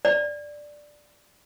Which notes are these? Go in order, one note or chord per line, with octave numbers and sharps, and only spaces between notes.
D5